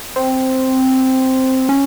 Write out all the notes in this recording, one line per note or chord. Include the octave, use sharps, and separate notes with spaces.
C4
C#4